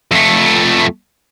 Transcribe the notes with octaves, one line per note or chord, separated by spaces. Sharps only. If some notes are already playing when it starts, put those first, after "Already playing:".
F2 A3